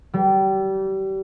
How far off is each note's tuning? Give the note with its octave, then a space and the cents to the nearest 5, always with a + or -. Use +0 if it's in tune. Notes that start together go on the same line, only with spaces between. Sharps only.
G3 -30